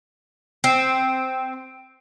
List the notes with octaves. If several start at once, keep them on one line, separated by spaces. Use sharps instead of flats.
C4